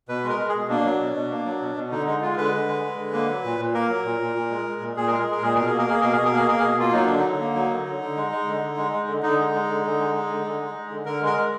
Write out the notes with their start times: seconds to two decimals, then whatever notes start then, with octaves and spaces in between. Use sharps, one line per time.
0.08 B2 B4
0.24 G#3
0.29 A#4
0.39 G#3
0.49 G#4
0.55 B2
0.69 A#3 D4
0.85 F#3
1.00 B2
1.15 B2
1.31 A#3
1.46 F#3
1.61 B2
1.76 B2
1.91 D3 D#4
2.07 G#3 D#4
2.22 G#3 F4
2.37 D3 B4
2.52 D3
2.68 G#3
2.83 G#3
2.98 D3
3.13 A#3
3.29 F#3
3.44 A#2
3.59 A#2
3.74 A#3 A#4
3.89 F#3
4.05 A#2
4.20 A#2
4.36 A#2
4.50 G#3
4.66 G#3
4.81 A#2
4.96 A#2 G#4
5.08 G#3 A#4
5.19 G#4
5.26 G#3
5.31 A#4
5.42 A#2 G#4
5.55 B2 A#4
5.66 G#4
5.73 A#3
5.78 A#4
5.87 A#3 G#4
6.01 B2 A#4
6.13 G#4
6.18 B2
6.24 A#4
6.33 A#3 G#4
6.48 A#3 A#4
6.59 B2 G#4
6.79 A#3 F4
6.92 F#3 D#4
7.06 D3 D4
7.19 D#4
7.25 D3
7.40 A#3
7.55 F#3
7.70 D3
7.86 D3
8.01 D3
8.16 G#3
8.32 G#3
8.47 D3
8.62 D3
8.77 G#3
8.92 G#3
9.08 D3
9.23 D3 D#4
9.38 G#3
9.53 G#3
9.68 D3
9.84 D3
9.99 G#3
10.14 G#3
10.29 D3
10.45 D3
10.60 G#3
10.75 G#3
10.90 D3
11.05 D3 A#4
11.21 G#3
11.26 A#4
11.36 G#3